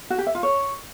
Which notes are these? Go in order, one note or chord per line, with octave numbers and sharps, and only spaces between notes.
F#4
G4
E5
F4
C#5